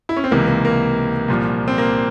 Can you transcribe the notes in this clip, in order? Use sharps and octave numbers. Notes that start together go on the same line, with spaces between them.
E4
C#4
C4
C#2 C3 E3 A#3
A#3
A#3
C2 A#2 F3
C4
A#3